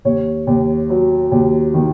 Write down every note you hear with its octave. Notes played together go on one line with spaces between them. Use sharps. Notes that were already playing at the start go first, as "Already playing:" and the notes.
D#2 C#5
D#2
F#3
D#2
D#3